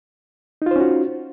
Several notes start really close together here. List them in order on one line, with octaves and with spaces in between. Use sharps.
D#4 F4 C5 C#4 F#4